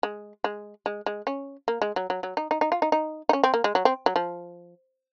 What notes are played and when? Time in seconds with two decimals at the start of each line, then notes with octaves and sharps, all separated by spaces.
0.03 G#3
0.44 G#3
0.86 G#3
1.06 G#3
1.27 C#4
1.68 A#3
1.82 G#3
1.96 F#3
2.10 F#3
2.23 F#3
2.37 D#4
2.51 D#4
2.61 D#4
2.72 F4
2.82 D#4
2.92 D#4
3.29 D#4
3.33 C#4
3.44 C4
3.54 A#3
3.64 G#3
3.75 F#3
3.85 C4
4.06 F#3
4.16 F3